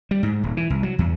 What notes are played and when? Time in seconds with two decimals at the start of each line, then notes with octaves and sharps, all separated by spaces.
0.11 G3
0.23 G#2
0.43 D#1
0.57 E3
0.70 C2
0.83 F#3
0.99 E2